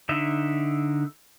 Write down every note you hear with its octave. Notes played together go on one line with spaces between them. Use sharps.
D3 D#4 E5